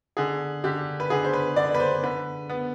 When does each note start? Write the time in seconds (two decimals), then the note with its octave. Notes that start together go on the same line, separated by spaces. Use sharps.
0.17 D3 G#4
0.64 D3 G4
1.00 B4
1.10 D3 G#4
1.25 C5
1.33 B4
1.56 D3 D5
1.74 B4
1.80 C5
2.03 D3 B4
2.50 B3